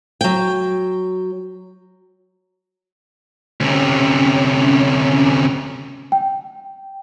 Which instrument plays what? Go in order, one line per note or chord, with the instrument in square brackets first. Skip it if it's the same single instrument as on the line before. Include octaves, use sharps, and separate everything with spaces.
[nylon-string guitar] F#3 G5
[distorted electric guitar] D2 C3 [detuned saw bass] C#4
[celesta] G5